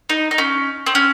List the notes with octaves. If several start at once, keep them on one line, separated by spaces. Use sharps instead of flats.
D#4
D#4
C#4
C4
C#4